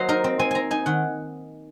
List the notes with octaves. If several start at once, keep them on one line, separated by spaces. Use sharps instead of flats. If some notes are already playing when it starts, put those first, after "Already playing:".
Already playing: F#3 A#3 C5 D#5
D#4 A#4
C4
C4 G#5
C4 G#5 A#5
D#4 G#5
D#3 F#5